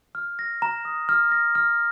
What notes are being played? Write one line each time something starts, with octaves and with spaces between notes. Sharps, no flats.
F6
A#6
A#5
D#6
F6
A#6
F6